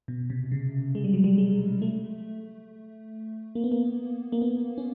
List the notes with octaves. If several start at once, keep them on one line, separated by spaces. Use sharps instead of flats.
B2
C3
C#3
G#3
G3
F#3
G3
G#3
A3
A#3
B3
A#3
A#3
B3
C#4